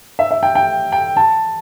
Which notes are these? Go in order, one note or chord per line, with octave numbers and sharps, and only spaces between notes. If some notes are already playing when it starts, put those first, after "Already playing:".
E5
E5
G5
G5
G5
A5